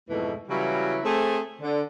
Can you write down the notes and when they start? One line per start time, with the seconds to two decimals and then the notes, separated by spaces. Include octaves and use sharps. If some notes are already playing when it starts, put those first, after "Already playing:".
0.10 F2 G#2 B2 E3 A3
0.49 C#3 E3 F#3 G3 E4 F#4
1.04 A3 C4 G#4
1.61 D3